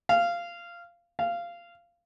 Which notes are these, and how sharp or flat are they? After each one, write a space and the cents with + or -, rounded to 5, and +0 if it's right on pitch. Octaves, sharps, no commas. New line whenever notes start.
F5 -15
F5 -15